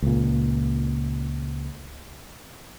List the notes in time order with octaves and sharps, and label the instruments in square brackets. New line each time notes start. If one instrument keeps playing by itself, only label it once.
[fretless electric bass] C#2 A#2